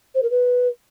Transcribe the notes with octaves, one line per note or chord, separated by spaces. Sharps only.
C5
A#4
B4